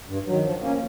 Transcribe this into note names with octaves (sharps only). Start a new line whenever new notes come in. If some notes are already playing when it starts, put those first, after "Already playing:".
G2
D#3 F#3
F3
A#3 C#4